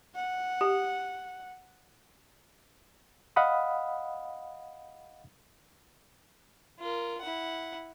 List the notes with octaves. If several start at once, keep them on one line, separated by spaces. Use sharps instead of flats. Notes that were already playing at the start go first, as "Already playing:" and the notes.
F#5
G4
D#5 F5 F#5 B5 D#6
F4 A#4
E4 F#5